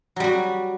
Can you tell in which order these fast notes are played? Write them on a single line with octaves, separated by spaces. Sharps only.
F#3 G3 F#4